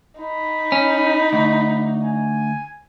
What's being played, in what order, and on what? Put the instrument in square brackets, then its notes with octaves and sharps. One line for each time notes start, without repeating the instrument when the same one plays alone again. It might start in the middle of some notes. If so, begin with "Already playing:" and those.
[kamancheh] D#4 [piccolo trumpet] B5
[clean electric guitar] C#4
D2
[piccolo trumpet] G#5